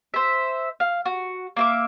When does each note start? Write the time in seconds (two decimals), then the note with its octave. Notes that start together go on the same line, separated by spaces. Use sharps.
0.14 C5 E5
0.80 F5
1.05 F#4
1.57 A#3 E5 D6